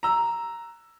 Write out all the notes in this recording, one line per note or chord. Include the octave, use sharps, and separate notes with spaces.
A#5 E6